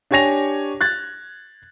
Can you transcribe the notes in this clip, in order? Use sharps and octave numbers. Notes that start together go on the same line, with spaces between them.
D4 G4 C#5 G#5 A#6 F7
F#6 G#6 A6